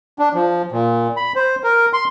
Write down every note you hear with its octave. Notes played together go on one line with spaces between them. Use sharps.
D4
F3
A#2
B5
C5
A#4
C6